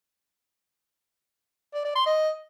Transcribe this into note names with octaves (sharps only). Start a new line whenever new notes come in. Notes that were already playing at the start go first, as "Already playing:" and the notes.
D5
D5
C6
D#5